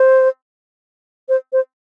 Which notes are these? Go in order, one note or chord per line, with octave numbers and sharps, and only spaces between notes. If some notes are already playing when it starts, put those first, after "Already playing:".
Already playing: C5
C5
C5